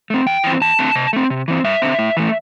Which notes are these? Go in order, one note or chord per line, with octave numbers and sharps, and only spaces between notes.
A3 C4
E2 G5
E3 C4
E2 A5
D3 A3 C4
C3
A3 C4
C3
E3 C4
G2 E5
D3 C4
A2
E3 A3